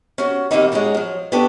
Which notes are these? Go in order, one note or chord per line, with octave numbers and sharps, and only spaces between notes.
C#4 F#4
D#3 G3 A3 A#3 C4 D#4
G#3 A#3 C#4 D#4 F#4
F3 F#3
B3 D4 F#4 G4 A4